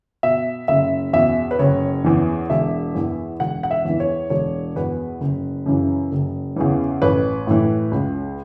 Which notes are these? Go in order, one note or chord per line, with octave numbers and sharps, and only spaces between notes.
B2 E5
F#1 E5
E2 B2 E5
B4
F#1 C#5
E2 E3
E1 E5
E2 E3
E1 F#5
F#5
E5
E2 E3
C#5
E1 C#5
E2 B2 B4
F#1
F#2 C#3 E3
F#1
E2 C#3 E3
A1 B4
A2 E3
C#2